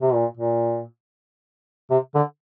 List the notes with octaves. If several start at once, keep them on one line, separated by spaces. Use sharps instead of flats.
C3
A#2
A#2
C3
D3